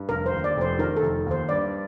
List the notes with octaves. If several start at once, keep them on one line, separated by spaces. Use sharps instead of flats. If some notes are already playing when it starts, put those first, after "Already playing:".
Already playing: G2
F1 A#4
C5
D#2
D5
F1
C5
D#3 A#4
A4
F1
D#2 C5
G2 D5